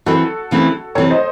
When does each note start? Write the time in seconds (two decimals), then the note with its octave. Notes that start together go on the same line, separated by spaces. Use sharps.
0.06 E3 C4 E4 F#4 A4
0.51 C#3 E3 A3 C4 E4
0.95 C3 E3 C4 A4 C#5
1.10 C5 D#5